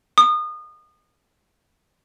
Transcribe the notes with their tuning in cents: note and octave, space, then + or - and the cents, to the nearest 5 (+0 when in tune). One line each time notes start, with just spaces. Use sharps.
D#6 -30